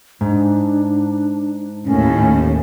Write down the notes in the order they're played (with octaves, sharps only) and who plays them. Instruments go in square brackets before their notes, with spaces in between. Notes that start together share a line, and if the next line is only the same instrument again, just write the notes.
[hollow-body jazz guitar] G#2 [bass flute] D4
[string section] D#2 A2 [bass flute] C#4